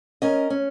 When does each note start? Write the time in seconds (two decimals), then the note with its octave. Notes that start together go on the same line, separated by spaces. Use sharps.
0.22 C#4 A#4 D#5
0.50 C#4